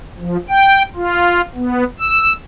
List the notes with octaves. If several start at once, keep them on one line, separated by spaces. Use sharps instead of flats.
F3
G5
F4
B3
E6